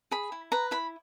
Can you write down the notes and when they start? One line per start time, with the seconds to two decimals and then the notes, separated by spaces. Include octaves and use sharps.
0.11 G#4 B5
0.32 E4
0.52 B4 A#5
0.71 E4 B5